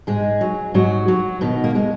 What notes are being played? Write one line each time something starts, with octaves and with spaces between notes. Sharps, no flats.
G#2 G#3 G#4
F#3
G#2 F#3 F#4
F#3
B2 D#3 D#4
A#3
G#3